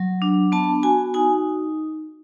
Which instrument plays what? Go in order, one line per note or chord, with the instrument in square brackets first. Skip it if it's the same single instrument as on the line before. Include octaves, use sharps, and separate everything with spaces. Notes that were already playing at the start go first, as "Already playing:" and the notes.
Already playing: [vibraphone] F#3
D4
B3 A5
F#4 G#5
D#4 G#5